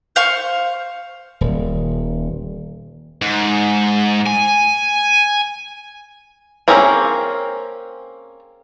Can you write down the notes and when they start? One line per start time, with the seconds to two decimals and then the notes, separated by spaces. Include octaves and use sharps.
0.16 C5 F5 C#6
1.41 D#1
3.22 G#2
4.26 G#5
6.68 A#3 C4 C#4 G#4 A#4